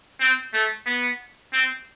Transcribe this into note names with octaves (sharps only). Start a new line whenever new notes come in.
C4
A3
B3
C4